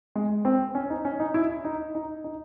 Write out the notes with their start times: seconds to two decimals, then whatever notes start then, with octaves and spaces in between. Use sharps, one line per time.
0.15 G#3
0.45 C4
0.75 C#4
0.90 D#4
1.05 C#4
1.20 D#4
1.34 E4
1.64 D#4
1.95 D#4
2.24 D#4